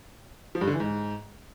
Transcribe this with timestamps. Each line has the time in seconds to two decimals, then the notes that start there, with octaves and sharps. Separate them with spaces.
0.55 F3
0.61 G2
0.67 D3
0.74 E3
0.80 G#2